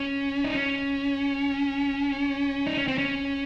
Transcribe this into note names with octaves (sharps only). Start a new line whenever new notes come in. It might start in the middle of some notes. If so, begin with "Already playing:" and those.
Already playing: C#4
D#4
C#4
D#4
C#4
C4
C#4